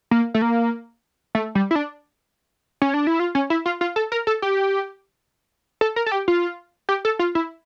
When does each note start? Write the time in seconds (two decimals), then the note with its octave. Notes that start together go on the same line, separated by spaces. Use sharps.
0.11 A#3
0.34 A3
0.42 A#3
1.35 A3
1.55 G3
1.71 E4
1.75 D4
2.82 C#4
2.94 D4
3.07 E4
3.20 F4
3.35 C#4
3.50 E4
3.66 F4
3.81 F4
3.96 A4
4.12 A#4
4.27 A4
4.42 G4
5.81 A4
5.96 A#4
6.06 A4
6.12 G4
6.28 F4
6.89 G4
7.05 A4
7.19 F4
7.35 E4